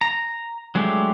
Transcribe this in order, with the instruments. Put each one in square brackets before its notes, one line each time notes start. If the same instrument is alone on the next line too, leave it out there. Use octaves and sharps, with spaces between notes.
[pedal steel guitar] A#5
F#3 G#3 A3 D4 G4